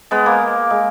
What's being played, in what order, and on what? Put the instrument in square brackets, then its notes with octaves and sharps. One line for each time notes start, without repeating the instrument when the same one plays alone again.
[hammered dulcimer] G#3 B3
A#3
G#3